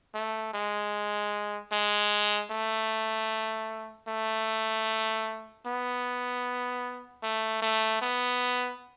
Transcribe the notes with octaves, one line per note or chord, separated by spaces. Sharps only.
A3
G#3
G#3
A3
A3
B3
A3
A3
B3